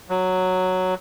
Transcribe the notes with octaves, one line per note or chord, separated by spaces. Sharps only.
F#3